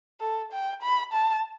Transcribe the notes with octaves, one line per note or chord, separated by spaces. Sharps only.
A4
G5
B5
A5